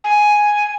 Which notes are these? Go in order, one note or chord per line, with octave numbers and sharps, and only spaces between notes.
G#5